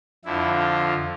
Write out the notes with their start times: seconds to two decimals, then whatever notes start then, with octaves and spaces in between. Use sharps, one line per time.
0.25 F2 D3 F3 E4
0.59 F4